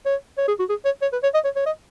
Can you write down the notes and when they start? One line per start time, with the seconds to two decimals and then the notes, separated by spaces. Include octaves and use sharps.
0.06 C#5
0.38 C#5
0.48 G#4
0.59 F#4
0.70 G#4
0.85 C#5
1.02 C#5
1.13 B4
1.23 C#5
1.34 D#5
1.44 C#5
1.56 C#5
1.66 D#5